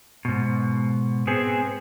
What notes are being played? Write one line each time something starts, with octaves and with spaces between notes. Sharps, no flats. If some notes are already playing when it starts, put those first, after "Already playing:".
G#2 B2
B3 C4 G#4